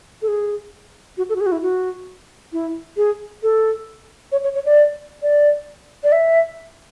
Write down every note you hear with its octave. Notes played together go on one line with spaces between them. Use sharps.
A4
G#4
F#4
A4
F#4
G#4
F#4
E4
F#4
E4
G#4
A4
C#5
C#5
C#5
D5
D5
D5
E5